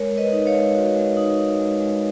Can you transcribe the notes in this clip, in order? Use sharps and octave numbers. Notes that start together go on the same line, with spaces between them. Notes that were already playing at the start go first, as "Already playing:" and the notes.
Already playing: G#3 A#4 C#5
G#3
B4 D#5
D#4
C#5 F5
G#3
F#4
G#3
D#4
D#4
G#3
G#3